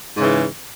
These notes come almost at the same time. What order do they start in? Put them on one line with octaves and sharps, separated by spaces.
G#2 C#3 E3